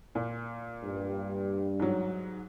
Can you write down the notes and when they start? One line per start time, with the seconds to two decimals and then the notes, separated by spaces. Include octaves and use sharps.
0.15 A#2
0.84 G2 G3
1.79 G#2 F#3